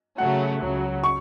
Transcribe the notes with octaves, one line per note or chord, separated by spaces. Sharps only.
C#3 F#3 A3 F#5
C#2 C#3 F#3
C#6